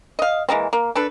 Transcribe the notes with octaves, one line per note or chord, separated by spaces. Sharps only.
D#5 F5
E3 G#3 A#3 C4
A#3
D4 A4 B4